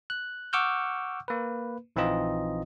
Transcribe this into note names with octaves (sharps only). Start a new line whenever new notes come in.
F#6
F#5 C#6 D6 E6 F6 G6
A#3 B4
A#1 E3 C4 D#4 F4 D#5